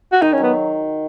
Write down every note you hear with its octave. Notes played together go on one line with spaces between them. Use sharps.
F#4
D#3 D#4
C#4
F#3
B3